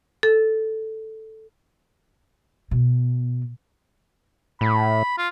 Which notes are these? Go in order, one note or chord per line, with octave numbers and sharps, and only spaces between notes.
A4
B2
A2 B5
F4